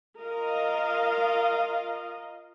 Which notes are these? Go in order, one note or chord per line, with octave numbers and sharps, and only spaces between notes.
F4 A#4 D#5 F5